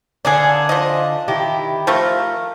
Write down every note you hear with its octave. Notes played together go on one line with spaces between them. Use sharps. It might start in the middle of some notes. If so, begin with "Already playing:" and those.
D3 A#3 D4 G#4
F3 D#5
D#3 E4 G4
F3 A3 A#4